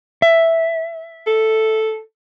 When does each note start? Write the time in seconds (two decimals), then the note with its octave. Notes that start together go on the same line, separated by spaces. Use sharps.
0.22 E5
1.27 A4